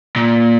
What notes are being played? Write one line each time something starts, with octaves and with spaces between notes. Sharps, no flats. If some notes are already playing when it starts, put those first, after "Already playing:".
A#2